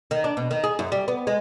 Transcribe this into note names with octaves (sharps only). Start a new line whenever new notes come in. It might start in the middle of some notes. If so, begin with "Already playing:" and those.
D#3
D4
B2
D#3
G#4
F#2
G3
B3
G#3